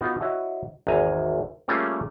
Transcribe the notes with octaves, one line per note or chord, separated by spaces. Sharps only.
B3 D#4 F4 F#4
E4 F#4 C#5 D#5
G#1 E2 G#5 A#5
G3 A3 A#3 C#4 F4 G#4